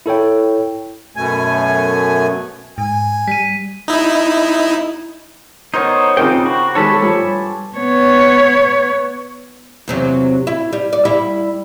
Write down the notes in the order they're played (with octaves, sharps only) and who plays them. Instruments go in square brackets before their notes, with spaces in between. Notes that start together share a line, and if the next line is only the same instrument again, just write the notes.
[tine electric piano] E4 A4 C#5 G5
[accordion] F#2 B2 A3 G#5
[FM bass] G#2 [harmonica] G#5
[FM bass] G3 [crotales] B6 D#7
[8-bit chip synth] D#4 E4
[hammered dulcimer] B3 A#4 C5 [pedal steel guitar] D#4 C#5
[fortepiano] C#3 F4 A#4 [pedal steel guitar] C4 D#4 G5 [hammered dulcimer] D6
[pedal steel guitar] F#4
[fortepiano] D#3 G3 G#3 [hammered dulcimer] A4 G#5 [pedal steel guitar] C#5 A5 B5
[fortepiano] G2 F3 G3
[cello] B3 C#5
[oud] E2 C3 F#3
E4
G3
D5
G3 E4